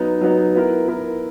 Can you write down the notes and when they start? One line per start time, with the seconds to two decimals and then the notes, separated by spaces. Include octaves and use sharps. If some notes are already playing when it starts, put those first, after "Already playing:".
Already playing: F#3 B3 D#4
0.21 F#3 B3 D#4
0.55 B3 E4 A#4
0.88 B3 E4 A#4